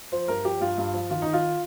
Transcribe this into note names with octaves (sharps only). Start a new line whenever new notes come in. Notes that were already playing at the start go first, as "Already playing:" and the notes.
F3 C5
G2 A#4
F3 G4
G2 F4
G2
F3
D#3 F4
D#3 D#4
F4